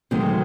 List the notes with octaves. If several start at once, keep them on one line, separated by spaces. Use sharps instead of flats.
D2 C3 D#3 F#3 G#3